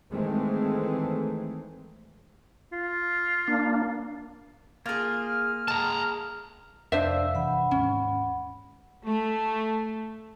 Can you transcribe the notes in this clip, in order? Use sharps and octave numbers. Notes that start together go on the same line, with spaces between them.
D#3 E3 G#3 A3 C4
F4
A#3 D4
A#3 F4 G#4 F6
G#3 A5 A#5
F1 F2 D4 C5 D5 E5 F5 E6
G1 C3 E3 F#5 B5
D#2 G#2 C#4
A3